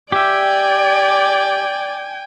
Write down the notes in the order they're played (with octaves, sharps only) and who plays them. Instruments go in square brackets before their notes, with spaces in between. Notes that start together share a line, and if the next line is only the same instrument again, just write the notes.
[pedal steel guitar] G4 E5 [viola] D5 [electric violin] G5 G#5